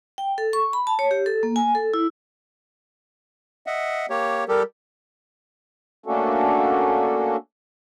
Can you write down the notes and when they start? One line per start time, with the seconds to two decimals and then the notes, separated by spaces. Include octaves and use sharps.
0.18 G5
0.38 A4
0.53 C#6
0.73 B5
0.87 A5
0.99 C#5
1.11 G4
1.26 A4
1.43 A#3
1.56 G#5
1.75 A4
1.94 E4
3.66 D#5 E5 F#5
4.10 A#3 G4 C#5
4.48 G3 G4 A4 A#4
6.06 A3 A#3 C#4 D4 F#4 A4